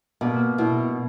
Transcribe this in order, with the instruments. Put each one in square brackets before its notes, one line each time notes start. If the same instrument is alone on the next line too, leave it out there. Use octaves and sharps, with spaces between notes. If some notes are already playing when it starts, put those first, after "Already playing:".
[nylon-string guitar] B2 [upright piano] A#3
[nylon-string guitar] B2 [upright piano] E4